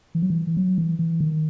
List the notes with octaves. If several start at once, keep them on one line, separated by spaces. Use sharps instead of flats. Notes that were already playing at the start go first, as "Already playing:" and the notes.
E3
F#3
E3
E3
F#3
E3
E3
D#3